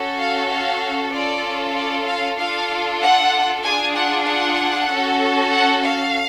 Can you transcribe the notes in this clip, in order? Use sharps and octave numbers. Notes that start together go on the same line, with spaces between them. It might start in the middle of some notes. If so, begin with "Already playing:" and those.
Already playing: C#4 F#4 A4
F5
F5
C#4 F4 A4 D5
D5
F5
D4 F4 A4 F5
F#5
D4 F4 G#4 G#5
F#5
F#5
C#4 F#4 A4
F#5
F5